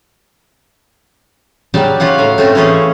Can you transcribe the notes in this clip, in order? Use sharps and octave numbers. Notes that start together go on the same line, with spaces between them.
C#3 F#3 G3 G4 D5 A5
C#4 F4 F5 F#5
A2 F#3 F5
A3 C4 C#4 F4
E3 A3 C#4 F4 G#4